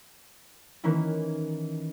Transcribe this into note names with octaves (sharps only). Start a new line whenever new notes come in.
D#3 E3 A#3 C#4 E4